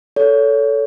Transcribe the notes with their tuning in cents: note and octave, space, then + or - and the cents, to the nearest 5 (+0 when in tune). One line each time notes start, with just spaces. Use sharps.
A4 +0 C#5 +30